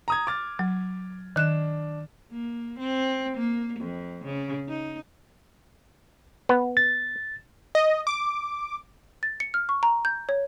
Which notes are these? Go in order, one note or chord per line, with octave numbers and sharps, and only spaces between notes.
A#5 D#6 G#6
D6 F6 A6
F#3
D#3 D4 F#6 E7
A#3
C4
A#3
F2
C#3
D#4
B3
A6
D#5
D6
A6
C#7
F6
C#6
A#5
G6
C#5